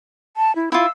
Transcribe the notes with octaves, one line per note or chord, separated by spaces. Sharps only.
A5
E4
E4 F4 E6